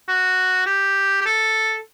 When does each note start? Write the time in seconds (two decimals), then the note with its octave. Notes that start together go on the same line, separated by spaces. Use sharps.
0.08 F#4
0.66 G4
1.21 G4
1.26 A4